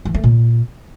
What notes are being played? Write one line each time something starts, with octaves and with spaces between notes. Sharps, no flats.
E3
A3
A#2